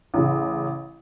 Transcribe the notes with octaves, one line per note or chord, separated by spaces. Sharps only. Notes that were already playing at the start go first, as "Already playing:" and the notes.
A1 C#3